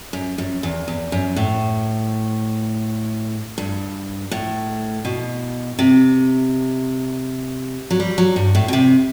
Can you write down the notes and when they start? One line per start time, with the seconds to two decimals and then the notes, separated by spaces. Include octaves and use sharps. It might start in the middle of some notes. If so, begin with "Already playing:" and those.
0.13 F#2
0.38 F#2
0.63 E2
0.88 E2
1.12 F#2
1.36 A2
3.58 G2
4.31 A2
5.05 B2
5.79 C3
7.91 F#3
8.00 G3
8.18 F#3
8.36 G2
8.55 A2
8.68 B2
8.73 C3